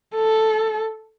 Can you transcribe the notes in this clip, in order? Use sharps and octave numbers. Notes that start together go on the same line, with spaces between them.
A4